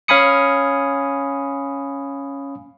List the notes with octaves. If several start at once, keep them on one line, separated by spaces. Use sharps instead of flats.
C#4 F5 G#5 B5 D#6 C#7